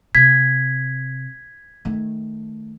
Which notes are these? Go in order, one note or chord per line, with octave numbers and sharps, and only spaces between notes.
C3 G#6 B6
D#3 A3